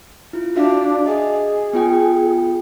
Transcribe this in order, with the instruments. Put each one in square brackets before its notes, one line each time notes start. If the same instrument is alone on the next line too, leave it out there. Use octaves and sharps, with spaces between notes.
[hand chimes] E4 F4
[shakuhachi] D4 [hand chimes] F#4 E5 F5
[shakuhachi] G#4 [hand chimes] D#5
[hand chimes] B3 F4 G5